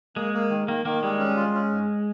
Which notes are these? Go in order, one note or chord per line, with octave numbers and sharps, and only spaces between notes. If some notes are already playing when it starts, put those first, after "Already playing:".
G#3 A#3
A#3
D#3
D#3 A#3
D#3 A#3
G3 G#3
C#4
F4
C#4
G#2